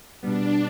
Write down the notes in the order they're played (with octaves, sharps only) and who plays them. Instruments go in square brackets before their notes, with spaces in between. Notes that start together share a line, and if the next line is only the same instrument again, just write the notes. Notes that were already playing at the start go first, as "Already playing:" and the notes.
[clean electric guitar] B2 G3 B3 [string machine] D4